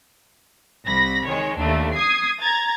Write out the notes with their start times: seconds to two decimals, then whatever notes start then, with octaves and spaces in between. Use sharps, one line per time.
0.87 C2 B5 A#6
1.28 D#3 G#3 C#5
1.60 D#2 A3 D4
1.95 D#6 G#6 C7
2.41 A#5 G#6 A6